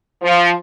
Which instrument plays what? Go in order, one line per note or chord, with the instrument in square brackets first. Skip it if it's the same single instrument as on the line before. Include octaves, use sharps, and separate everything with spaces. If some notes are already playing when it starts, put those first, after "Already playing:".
[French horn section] F3